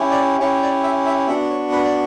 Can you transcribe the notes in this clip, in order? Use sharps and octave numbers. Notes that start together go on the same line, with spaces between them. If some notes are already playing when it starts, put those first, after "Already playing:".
Already playing: C#4 E4 G4
D5
C#4 E4 G4 C#5
D5
E5
E5
B3 D4 F#4 E5
C#5
B4
D5